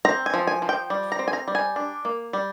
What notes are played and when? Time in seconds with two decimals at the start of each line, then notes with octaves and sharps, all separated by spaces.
0.05 C4 A#5
0.26 G#5
0.34 F3
0.47 G#5
0.62 F3
0.69 G5
0.90 G3
1.12 A#5
1.19 C4
1.28 G#5
1.33 A#5
1.48 G3
1.55 G#5
1.76 D4
2.05 A#3
2.33 G3